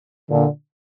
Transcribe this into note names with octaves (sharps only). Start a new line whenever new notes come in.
A#2 D3